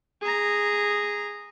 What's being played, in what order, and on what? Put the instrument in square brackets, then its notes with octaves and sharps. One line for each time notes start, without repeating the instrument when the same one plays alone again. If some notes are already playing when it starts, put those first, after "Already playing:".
[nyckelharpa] G#4 A#5